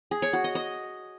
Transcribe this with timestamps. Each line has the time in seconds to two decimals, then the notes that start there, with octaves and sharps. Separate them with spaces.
0.11 G#4
0.22 C#5
0.33 F#4
0.44 D#5
0.55 D#5